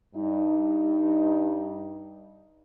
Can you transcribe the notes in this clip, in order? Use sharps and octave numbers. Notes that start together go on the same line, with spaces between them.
G2 D#4